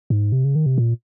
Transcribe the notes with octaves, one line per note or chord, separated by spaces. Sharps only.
G#2
C3
C#3
D#3
C3
A#2